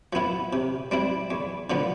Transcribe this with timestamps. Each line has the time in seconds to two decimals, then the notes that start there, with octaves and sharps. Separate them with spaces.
0.13 F3 B3 E4
0.53 C3
0.91 G3 C4 E4
1.31 E2
1.70 D3 F3 B3